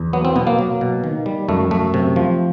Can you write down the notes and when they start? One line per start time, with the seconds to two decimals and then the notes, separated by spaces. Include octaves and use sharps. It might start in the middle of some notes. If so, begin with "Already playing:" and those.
Already playing: E2
0.13 F#3 B3
0.25 C4
0.36 B2 B3
0.47 A#3
0.59 F#3
0.81 B2
1.04 D#3
1.26 G3
1.49 F#2 A3
1.71 F#2 A3
1.94 C3
2.16 F3